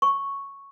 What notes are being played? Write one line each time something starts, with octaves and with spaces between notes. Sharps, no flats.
C#6